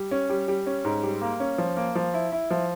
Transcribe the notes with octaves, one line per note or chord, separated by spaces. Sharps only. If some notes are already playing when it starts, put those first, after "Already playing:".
Already playing: G3
C#4
G3
G3
C#4
G#2
G3
A#3
C#4
F3
A#3
F3
E4
E4
F3